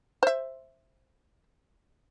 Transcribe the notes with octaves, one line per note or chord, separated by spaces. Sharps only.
C5 E5